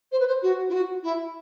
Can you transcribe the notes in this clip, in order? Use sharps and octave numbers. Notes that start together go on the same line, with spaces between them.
C5
B4
C5
F#4
E4
F#4
E4